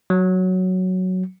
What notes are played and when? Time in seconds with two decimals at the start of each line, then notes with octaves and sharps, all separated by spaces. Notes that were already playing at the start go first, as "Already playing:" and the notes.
0.10 F#3